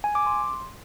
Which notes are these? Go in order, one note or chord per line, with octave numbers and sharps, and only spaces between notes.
G#5
D6
C6